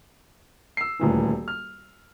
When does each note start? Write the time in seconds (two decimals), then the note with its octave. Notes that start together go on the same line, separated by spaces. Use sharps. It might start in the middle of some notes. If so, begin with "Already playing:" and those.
0.77 E6 C7
0.99 D#1 D2 E3
1.48 F6